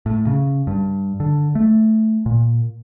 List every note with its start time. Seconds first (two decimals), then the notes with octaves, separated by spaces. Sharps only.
0.06 A2
0.27 C#3
0.67 G2
1.20 D3
1.55 A3
2.26 A#2